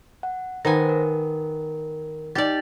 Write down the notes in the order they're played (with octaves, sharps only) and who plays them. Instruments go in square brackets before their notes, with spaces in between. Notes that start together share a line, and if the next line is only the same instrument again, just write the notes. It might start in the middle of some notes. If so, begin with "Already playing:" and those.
[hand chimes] F#5
[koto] D#3 B3 G#5 [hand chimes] A#4 C5 A#6
[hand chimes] A#4
[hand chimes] D#4 A6 [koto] G4 D5